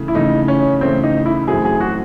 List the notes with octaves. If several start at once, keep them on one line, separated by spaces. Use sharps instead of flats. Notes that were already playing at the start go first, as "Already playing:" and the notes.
Already playing: C#3 E3 A3
E4
C#3 E3 A3 D#4
C#4
C#3 E3 A3 C4
D#4
E4
F#2 E3 A3 C4 F#4 G#4
G#4
F#4